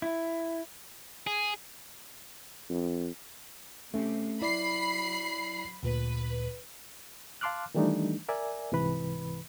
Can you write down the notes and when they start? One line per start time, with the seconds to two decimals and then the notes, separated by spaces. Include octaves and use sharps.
0.02 E4
1.27 G#4
2.70 F2
3.94 C3 A3 C#4
4.42 F#3 E4 D5 B5 C7
5.83 D2 A#2 B4
7.41 F5 A5 C6 D6 F6 F#6
7.74 D#3 E3 G3 A3 D4 D#4
8.29 A#4 D5 E5 G#5
8.72 C2 G#2 C3 E3 B4 B5